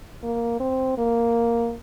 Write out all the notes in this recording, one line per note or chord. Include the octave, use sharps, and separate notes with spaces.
A#3
C4
A#3